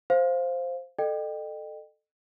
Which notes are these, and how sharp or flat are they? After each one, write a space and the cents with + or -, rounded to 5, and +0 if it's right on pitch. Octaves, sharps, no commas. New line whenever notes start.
C5 +0 F5 +0
A4 +0 D#5 -35 G5 +0